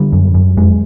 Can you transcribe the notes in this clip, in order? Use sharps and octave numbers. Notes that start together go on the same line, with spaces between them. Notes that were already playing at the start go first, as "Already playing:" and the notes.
Already playing: D3 G3
F#2
F#2
F2 G#3